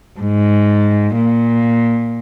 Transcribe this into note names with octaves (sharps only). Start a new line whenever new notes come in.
G#2
A#2